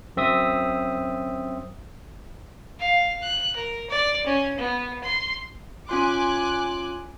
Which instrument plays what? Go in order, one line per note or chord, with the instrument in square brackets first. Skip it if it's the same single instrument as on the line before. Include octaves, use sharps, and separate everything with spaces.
[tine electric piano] F#2 C4 E5 D#6
[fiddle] F5
F#6
A#4
D5
C#4
B3
C6
[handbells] C#4 F4 C6 [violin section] G#5 D6 F#6